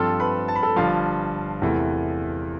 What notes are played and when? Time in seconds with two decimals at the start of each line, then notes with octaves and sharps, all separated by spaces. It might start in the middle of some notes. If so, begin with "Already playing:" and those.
Already playing: G2 F3 C4 F4 A4 A5
0.20 B4 B5
0.48 A5
0.55 B5
0.63 A4 A5
0.76 G1 G2 F3 F4 F5
1.62 E2 C3 E3 A3